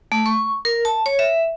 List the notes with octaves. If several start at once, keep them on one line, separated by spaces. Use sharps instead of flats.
A3
C#6
A#4
A5
C#5
E5